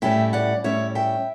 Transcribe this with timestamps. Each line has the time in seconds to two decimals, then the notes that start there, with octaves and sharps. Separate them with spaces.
0.02 A2 G3 C#4 E4 E5 G5
0.33 D5 F#5
0.64 A2 G3 C#4 E4 C#5 E5
0.95 E5 G5